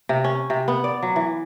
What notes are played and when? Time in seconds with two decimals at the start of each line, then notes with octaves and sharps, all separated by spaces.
0.09 C3
0.24 C#4
0.50 C3
0.68 B3
0.84 D5
1.03 F#3
1.16 E3